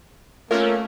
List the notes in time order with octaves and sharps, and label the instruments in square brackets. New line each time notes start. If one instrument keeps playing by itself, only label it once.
[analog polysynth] A3 C#4 [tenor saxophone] A#3 [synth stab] F4 C#5 [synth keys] A#4